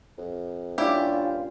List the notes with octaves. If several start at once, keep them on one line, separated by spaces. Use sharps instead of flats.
F2
G2 A#2 C#4 D4 E4 F4 G4